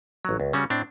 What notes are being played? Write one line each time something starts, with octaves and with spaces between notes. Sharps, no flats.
A1 F#3
C#2
C#3 G3 C#4 F#4
A2 C4 D4